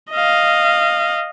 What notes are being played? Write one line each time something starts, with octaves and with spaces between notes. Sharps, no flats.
D#5 F5